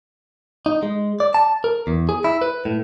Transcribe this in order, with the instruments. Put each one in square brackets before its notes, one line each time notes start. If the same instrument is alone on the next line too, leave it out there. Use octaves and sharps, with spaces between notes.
[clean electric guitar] D#4
G#3
D5
A5
A#4
E2
G#4
E4
B4
A2